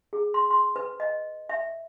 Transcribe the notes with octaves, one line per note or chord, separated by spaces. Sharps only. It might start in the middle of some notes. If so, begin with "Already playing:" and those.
G#4
C6
C6
B4
D#5
E5